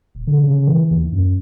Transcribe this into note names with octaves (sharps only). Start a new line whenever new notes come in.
D#1
D3
C#3
E3
D#2
F#2